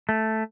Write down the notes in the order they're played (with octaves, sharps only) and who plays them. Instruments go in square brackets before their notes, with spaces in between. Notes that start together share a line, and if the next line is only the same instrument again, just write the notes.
[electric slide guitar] A3